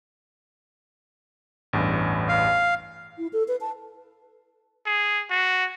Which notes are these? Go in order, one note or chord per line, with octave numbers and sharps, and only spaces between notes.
A1 E2 G2
F5
E4
A4
B4
A5
G#4
F#4